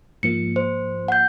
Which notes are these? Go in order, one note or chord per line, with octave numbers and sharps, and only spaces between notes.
G#2 F3 A#3 C#7
C5
F#5 G6